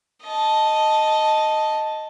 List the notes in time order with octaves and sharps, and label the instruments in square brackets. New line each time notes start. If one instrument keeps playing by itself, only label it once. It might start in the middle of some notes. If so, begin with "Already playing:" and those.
[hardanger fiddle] D#5 A5